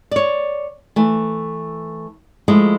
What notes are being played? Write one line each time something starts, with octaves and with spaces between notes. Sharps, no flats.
C#5 D5
E3 A3
F3 G#3 A3 E4